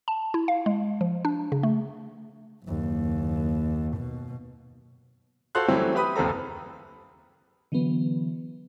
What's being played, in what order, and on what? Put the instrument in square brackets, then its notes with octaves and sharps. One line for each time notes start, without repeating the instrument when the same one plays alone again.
[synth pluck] A5
E4
F5
G#3
F3
D4
C#3
A3
[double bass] F#1 D#2
B2
[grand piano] F#4 A4 C5 F5 C6 F#6
E3 F#3 G3 A3 C4 C#4
E4 G4 B4 B5 D#6
F#1 D#2 C4 A4 A#5
[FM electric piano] D3 E3 F#3 B3